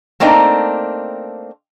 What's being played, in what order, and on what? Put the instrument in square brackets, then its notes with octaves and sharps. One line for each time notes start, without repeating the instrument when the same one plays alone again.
[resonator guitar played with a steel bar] A3 A#3 C4 D4 D#4